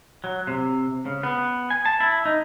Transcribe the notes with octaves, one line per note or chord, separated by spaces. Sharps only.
F#3
C3
C#3
B3
G#5
A5
E4
D#4